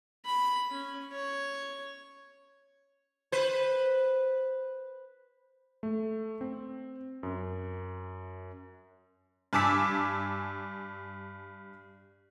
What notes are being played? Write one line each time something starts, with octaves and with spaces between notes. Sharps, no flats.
B5
C#4
C#5
B4 C5
A3
C4
F#2
G2 G#5 A5 D6 E6 B6